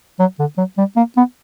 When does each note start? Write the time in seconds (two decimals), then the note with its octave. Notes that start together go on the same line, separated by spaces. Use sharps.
0.19 F#3
0.39 D3
0.58 F#3
0.78 G3
0.96 A#3
1.17 B3